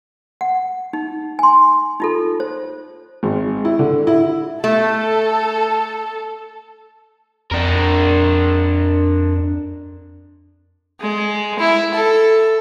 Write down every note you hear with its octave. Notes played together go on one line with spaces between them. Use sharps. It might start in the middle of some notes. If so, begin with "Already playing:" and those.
F#5
D#4
G#5 C6
D#4 F4 A4
C5
G#1
E4
D3
E4
A3 A4
F2 D4 A#4
G#3
E4
A4